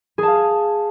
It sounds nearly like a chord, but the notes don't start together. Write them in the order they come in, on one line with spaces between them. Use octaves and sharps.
G#4 A5 F5